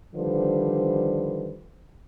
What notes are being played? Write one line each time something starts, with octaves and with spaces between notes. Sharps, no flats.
D3 D#3 F3 G3 B4 C5